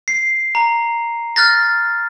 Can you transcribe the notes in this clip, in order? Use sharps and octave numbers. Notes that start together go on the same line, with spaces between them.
C7
A#5
F6 F#6 A6 A#6